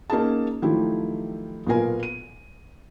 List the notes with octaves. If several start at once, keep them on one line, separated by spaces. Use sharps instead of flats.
A#3 C#4 D#4 F#4 G#4 A5
D#3 F3 F#3 A3 E4 G4
B1 A#2 B3 F4 A#4 G#5
D#7